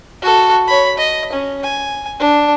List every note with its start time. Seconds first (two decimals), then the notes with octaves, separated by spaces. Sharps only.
0.22 F#4 A4
0.68 C#5 B5
0.97 D#5
1.32 C#4
1.63 G#5
2.20 D4